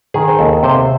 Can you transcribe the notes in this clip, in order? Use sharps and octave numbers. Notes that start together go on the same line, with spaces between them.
D#3 G#4
C5
D#2 A4
C3 C5